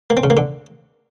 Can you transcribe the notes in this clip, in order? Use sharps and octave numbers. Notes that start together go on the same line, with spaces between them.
A#3
C4
C#3
A#3
D3